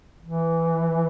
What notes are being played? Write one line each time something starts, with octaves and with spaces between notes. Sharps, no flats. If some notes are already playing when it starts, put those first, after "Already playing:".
E3